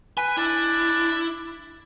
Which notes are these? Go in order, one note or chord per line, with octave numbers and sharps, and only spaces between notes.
B4 G#5
D4 E4